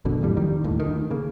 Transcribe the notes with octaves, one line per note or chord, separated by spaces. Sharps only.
G#1 F#2 B2 D3
D1 F2 A2 G3
D#3 G3
G1 D#2 A2
D2 D#3
C#3 A#3